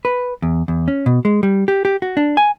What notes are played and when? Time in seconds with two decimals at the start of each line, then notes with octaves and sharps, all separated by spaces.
0.05 B4
0.42 E2
0.68 E2
0.88 C#4
1.06 B2
1.25 G#3
1.43 G3
1.68 G4
1.85 G4
2.02 F#4
2.17 D4
2.37 G#5